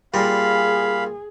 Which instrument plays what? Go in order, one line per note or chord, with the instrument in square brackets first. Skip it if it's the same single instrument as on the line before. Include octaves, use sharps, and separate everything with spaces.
[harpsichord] A#2 G3 A#4 [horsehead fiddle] G#4 [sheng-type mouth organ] F5 B5